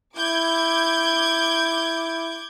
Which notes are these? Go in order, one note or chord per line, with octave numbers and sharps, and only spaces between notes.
E4 D6 G6 G#6